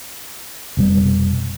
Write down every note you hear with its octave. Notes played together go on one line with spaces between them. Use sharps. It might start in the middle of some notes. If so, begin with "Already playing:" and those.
F1 B2 G3